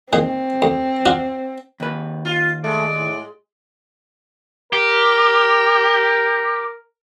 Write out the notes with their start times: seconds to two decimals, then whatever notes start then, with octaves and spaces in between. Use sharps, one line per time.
0.13 A#2 D#3 C4 G#4
0.62 D2
1.06 D4 F4 F#4
1.80 D#2 B4
2.25 F4
2.64 G#3 A3 D5
2.97 A2
4.73 G4 A#4